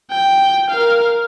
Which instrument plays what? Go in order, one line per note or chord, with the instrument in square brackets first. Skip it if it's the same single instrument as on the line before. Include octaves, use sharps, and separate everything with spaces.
[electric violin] G5
A#4 F5